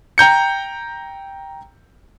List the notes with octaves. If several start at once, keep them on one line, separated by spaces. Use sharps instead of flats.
G5 A#5 G6 C#7